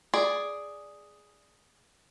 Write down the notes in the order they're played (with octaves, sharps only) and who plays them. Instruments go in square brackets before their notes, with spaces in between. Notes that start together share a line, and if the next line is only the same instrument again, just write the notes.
[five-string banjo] G#4 D5